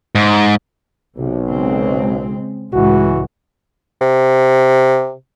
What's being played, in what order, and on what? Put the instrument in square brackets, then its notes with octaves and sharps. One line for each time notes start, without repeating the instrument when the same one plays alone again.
[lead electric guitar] G#2
[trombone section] B1 [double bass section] C3
[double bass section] C#3 G#3 C4
[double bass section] C#2 A2 G#3 [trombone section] E3 F#4
[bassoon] C3